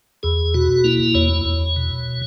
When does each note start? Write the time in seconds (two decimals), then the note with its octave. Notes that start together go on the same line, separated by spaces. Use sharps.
0.23 E2 G#4
0.54 B2 F#4
0.84 A#3 E4
1.14 E2 C#5
1.45 E2
1.76 B2